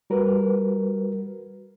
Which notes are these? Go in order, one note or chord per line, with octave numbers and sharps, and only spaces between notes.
G3 F#4 A#4 B4